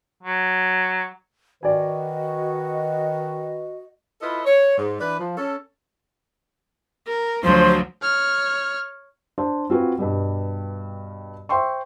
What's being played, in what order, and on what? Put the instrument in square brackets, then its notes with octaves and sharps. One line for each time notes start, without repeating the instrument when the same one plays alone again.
[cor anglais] F#3
[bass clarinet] D#3 [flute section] F#4 D#5 [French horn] B4 [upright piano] D5 G#5
[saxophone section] E4 F4 A4 B4 D#5
C#5
G#2
E3 D4 B4
F3
C#4 A4
[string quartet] A#4
[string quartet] D2 F3 F#3 [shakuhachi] C5
[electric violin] C#5 F6
[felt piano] D4 C5
C4 F4 F#4 B4 G#5
G2 B2 G3
C5 E5 G5 C6 C#6